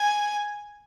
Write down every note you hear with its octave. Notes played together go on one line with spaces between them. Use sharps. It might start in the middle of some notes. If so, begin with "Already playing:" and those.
Already playing: G#5